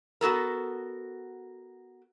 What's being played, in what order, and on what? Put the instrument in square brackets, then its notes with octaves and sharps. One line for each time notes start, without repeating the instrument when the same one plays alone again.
[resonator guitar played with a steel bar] B3 F#4 A4 A#4